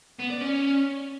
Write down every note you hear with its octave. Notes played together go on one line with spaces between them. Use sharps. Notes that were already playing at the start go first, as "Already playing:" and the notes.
B3
D5
C#4